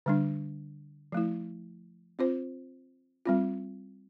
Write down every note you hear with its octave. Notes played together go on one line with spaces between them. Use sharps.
D3 G3 D4
F3 A3 E4
C4 F4 C5
G3 C4 F4